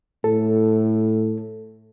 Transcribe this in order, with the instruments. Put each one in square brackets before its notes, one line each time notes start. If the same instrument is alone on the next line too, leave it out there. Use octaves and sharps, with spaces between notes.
[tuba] A2 [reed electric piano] A4